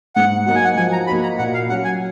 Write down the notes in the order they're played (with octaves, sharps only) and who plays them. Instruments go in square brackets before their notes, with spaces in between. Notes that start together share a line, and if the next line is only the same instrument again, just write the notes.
[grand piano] G#2 [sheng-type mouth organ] F#5
[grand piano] F#3 A#3 D#4 F#4 [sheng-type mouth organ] F#5
[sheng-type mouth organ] G#5
F#5
[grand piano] F3 [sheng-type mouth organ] G#5
[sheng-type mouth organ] A#5
[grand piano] A#3 D#4 F#4 [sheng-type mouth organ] B5
[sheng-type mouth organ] A#5
[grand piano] A#2 [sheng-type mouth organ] F#5
[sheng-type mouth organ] F5
[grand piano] F#3 C#4 [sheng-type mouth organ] F#5
[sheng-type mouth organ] G#5